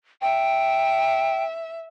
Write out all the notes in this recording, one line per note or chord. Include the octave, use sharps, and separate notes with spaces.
E5 G5